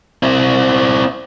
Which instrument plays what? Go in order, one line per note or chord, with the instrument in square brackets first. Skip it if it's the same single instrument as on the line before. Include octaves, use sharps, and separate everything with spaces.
[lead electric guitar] C4 E4